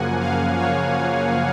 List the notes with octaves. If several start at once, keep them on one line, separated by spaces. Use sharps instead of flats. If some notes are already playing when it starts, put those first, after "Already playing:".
Already playing: F#2 C#3 F3 A#3 F#5 G#5
F5
C#5